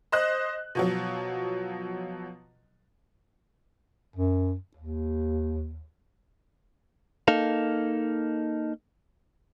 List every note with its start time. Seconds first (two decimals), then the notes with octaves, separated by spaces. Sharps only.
0.12 C5 D#5 F#6
0.75 B2 F3 F#3
4.16 F#2
4.76 D#2
7.28 A#3 D#4 A4 F5